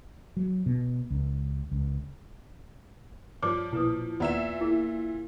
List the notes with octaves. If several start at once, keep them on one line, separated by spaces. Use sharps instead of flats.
F#3
B2
C#2
C#2
G2 F3 C#5 D5 D6
B1 A#2 E4 B4 D#6
D#2 A#2 B3 C5 D5 E5 A#5 E7
E4 G#4 A#4